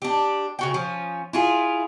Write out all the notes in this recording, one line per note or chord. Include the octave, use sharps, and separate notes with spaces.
D4 G4
C#3 F#4 G5
F3 C#4
E4 F4 G#4